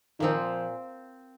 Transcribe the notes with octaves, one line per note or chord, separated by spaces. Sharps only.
A#2 D#3 F3 C4 D#4